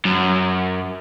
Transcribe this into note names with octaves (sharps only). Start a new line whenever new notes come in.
F#2